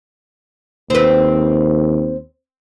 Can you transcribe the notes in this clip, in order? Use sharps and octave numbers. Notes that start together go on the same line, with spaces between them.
D#2 C4 B4